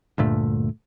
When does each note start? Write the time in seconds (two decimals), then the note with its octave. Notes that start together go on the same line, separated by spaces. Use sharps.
0.18 D2 G2 A#2 A3